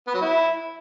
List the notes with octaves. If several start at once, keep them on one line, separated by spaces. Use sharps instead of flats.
B3
F#3
E4